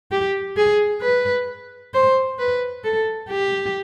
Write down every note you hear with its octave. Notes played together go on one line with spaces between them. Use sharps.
G4
G#4
B4
C5
B4
A4
G4